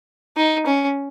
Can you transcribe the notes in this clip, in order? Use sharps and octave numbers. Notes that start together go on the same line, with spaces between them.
D#4
C#4